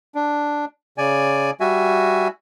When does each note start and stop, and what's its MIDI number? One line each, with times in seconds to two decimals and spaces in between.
0.15 0.65 62
0.98 1.51 49
0.98 1.51 74
0.98 1.51 80
1.60 2.28 55
1.60 2.28 66
1.60 2.28 76
1.60 2.28 80